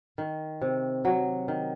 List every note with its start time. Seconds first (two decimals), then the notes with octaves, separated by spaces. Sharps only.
0.18 D#3
0.61 C3
1.05 F#3
1.48 D#3